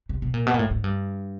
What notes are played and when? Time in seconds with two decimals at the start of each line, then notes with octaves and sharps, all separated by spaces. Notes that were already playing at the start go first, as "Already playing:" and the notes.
0.09 C3
0.22 B2
0.34 A#2
0.47 B2
0.54 A#2
0.59 A2
0.71 G#2
0.84 G2